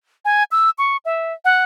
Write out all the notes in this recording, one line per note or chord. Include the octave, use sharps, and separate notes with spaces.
G#5
E6
C#6
E5
F#5